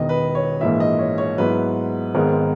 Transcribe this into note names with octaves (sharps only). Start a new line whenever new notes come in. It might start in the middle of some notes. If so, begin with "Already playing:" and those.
Already playing: E1 E2 D#3 D#5
B4
C#5
A#1 G#2 E3 A#3 E5
D#5
C#5
C#5
G#2 F#3 B3 E4 B4
G#1 G#2 D#3 G#3 B3 A#4